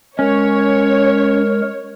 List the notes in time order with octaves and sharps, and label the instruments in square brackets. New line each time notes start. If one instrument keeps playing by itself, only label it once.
[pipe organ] G#3 A#4 [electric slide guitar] C#4 [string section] C#5